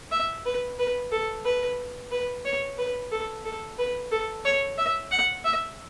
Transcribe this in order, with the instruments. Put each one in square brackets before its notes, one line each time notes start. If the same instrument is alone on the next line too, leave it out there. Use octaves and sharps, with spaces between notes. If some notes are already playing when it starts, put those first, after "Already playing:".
[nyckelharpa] E5
B4
B4
A4
B4
B4
C#5
B4
A4
A4
B4
A4
C#5
E5
F#5
E5